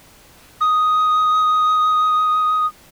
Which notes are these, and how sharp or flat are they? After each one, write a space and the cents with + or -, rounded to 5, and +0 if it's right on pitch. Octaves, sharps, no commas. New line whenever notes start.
D#6 +5